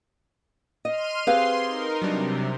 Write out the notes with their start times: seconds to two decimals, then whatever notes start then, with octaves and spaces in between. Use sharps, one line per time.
0.85 D#5 C6 F6 D#7
1.27 C4 G4 G#4 B4 F5 C6
1.67 D#4 A#4
2.02 C3 F#3 G3 D4